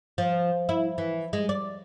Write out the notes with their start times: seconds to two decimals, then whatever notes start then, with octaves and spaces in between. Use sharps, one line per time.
0.18 F3
0.69 E4
0.98 E3
1.33 G#3
1.49 D5